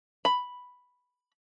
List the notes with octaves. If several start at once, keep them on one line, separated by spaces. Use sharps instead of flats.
B5